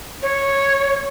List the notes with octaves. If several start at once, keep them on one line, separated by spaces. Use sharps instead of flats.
C#5